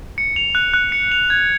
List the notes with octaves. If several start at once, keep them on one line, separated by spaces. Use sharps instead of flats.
C#7
F7
F#6
F#6
C#7
F7
G#6